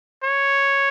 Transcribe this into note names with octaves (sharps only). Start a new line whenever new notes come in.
C#5